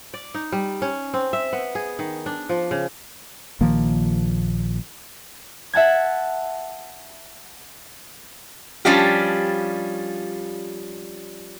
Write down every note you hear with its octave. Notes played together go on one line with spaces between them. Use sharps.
D5
D#4
G3
C#4
C4
E5
B3
G#4
D#3
D4
F3
C#3
A#1 D#3 F3 A#3
E5 F#5 A5 G#6
F3 G3 C#4 D4 F4 G4